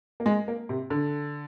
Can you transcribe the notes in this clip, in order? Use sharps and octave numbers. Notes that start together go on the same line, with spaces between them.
A#3
G#3
A#3
C3
D3